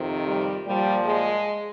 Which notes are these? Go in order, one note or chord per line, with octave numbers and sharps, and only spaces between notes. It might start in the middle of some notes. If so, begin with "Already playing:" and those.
Already playing: F2 C3 D#3
G3
A#2 F3 G3
G#3